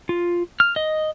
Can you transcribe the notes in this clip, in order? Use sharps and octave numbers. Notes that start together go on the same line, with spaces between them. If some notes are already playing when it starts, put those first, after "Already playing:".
F4
F6
D#5